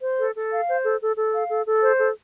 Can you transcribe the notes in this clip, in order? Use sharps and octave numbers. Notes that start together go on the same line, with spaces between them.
C5
A4
A4
F5
C5
A4
A4
A4
F5
A4
A4
C5
A4